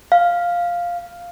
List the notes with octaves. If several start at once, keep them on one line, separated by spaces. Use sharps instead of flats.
F5